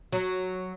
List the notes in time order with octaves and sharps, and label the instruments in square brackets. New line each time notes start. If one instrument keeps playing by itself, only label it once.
[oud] F#3